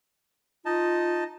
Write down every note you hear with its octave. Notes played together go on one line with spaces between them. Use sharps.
D#4 F4 D#5 A5